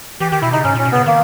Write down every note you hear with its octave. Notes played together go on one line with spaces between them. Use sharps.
E3 G4
D#3 G4
B2 E4
C#3 D#4
G#2 C#4
A#2 C#4
B2
C#3 B3
D#3 A#3